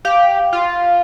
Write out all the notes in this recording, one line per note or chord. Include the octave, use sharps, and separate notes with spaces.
G4 F5
F4